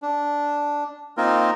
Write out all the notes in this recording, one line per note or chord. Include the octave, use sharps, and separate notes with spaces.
D4
A#3 C4 D#4 F4 A#4